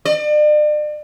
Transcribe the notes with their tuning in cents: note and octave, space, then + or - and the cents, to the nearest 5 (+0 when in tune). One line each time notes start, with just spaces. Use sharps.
D5 +40